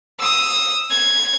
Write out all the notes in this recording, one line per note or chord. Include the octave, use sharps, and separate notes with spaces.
D#6 E6
G#6